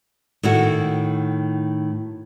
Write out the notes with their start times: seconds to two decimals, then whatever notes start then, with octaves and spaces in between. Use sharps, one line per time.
0.43 A2 D#3 E4 F#4